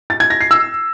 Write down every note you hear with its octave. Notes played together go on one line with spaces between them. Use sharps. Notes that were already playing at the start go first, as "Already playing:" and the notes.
A6
G#6
A#6
C7
E6